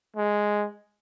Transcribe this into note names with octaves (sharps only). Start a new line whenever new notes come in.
G#3